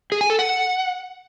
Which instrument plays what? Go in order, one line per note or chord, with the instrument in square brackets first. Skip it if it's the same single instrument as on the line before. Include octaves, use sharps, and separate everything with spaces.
[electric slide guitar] G#4
G#5
A4
F#5